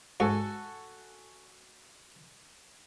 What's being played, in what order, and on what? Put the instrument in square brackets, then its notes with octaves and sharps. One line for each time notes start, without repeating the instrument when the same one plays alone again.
[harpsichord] G#2 C#6 [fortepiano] F#4 A4 G#5